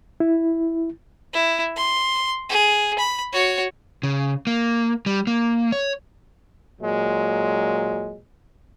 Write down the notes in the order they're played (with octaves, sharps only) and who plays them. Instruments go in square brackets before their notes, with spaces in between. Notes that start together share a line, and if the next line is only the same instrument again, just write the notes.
[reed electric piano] E4
[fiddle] E4
C6
G#4
B5
F#4 C#5
[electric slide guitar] C#3
A#3
G3
A#3
C#5
[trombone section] A#2 F#3 G#3